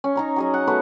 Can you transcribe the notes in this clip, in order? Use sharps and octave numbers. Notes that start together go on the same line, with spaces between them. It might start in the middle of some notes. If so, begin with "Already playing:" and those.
C#4
D#4 A#5 C#6
F#3 G#4 D#5
F#5
A3 B3 F#4